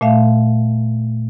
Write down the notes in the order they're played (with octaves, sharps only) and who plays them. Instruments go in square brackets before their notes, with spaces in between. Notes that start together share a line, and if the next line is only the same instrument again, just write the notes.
[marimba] A#2 A3 E5 F5